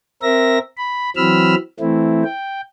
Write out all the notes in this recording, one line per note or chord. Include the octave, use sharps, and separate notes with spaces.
C4 A#4 E5 A#6
B5
E3 F#3 C4 B5 E6 F6
E3 A3 C4 E4
G5